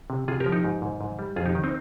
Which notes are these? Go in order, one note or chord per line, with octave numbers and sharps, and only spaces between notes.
C3
C3 F4 G#4
G4 A#4
F3
D#4 G4
G#2
G#2
G#2
G3
F2 F4 G#4
D#4 G4
D#3
C4 D#4